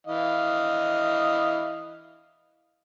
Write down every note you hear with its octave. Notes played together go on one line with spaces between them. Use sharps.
E3 D#5 F5